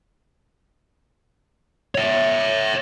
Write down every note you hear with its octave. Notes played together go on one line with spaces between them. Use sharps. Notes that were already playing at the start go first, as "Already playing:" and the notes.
C#5 E5